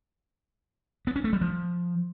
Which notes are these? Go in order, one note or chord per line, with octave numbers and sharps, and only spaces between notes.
B3
C#4
A3
G3
F3